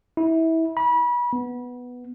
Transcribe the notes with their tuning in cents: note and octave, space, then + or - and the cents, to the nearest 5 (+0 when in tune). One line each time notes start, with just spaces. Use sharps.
E4 -25
B5 -30
B3 +0